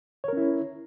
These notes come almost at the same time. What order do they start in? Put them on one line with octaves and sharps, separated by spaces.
C#5 A#4 C#4 E4